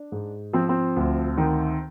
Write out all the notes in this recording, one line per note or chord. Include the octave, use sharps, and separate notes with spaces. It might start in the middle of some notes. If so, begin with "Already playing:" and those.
Already playing: D4
G#2
F3 C4
C4
D2
D#3